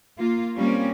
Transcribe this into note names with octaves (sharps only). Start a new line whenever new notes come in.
A#3 F4
G3 A#3 C4 C#4